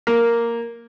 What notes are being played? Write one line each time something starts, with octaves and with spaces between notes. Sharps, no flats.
A#3